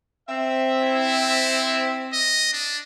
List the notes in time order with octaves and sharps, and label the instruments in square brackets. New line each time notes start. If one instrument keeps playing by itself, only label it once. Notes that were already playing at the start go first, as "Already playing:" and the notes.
[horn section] C4 E5
[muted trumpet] E4
D#5
D4